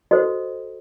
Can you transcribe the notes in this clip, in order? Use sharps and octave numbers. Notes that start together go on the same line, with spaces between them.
F#4 A4 C5 D#5